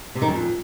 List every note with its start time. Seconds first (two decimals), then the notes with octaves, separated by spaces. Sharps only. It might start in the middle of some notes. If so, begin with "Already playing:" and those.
0.15 C3
0.22 D#3
0.28 F#2
0.34 F2